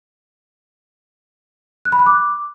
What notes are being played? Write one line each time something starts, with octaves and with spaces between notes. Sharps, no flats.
F#6
B5
F#6
D6